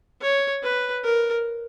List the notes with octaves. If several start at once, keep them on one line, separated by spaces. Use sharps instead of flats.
C#5
B4
A#4